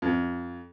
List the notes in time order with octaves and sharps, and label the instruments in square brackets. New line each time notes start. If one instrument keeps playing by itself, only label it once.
[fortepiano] F2